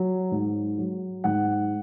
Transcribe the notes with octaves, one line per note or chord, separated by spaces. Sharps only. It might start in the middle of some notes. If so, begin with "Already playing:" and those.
Already playing: F#3
G#2
F#3
G#2 F#5